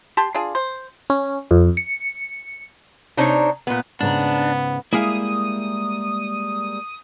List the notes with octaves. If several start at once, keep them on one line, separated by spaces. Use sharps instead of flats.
G4 A5 C6
D4 F4 G#4
C5
C#4
F2
C#7
C3 D4 D#4 C5 C#5 A#5
A#2 B3
G#2 C#3 B3 D4 A#5
G3 G#3 A#3 E4 G#4 F5 D#6